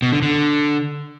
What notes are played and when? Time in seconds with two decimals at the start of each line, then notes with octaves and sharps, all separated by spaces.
0.02 B2
0.12 D3
0.22 D3